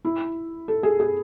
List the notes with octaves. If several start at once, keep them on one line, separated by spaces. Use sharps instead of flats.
E4
A4
G#4
G#4